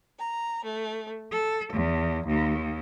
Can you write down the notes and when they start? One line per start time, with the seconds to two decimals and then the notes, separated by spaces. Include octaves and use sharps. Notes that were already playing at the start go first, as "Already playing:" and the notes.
0.19 A#5
0.65 A3
1.31 A4
1.71 E2
2.26 D#2